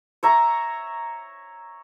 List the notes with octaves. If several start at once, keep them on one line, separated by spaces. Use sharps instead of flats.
C#5 E5 A#5